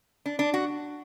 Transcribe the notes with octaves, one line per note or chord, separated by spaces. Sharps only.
D4
D4
F#4